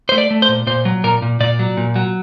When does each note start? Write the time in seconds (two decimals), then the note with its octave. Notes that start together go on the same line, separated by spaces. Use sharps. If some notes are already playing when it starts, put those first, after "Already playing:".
0.09 A3 C5
0.18 D5
0.31 A3
0.42 C5
0.49 A#2
0.67 A#2 C5
0.85 F#3
1.04 A#2 A#4
1.22 A#2
1.40 A#2 D5
1.59 F#3
1.77 A#2
1.96 F#3